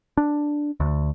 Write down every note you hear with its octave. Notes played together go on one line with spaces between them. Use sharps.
D4
D2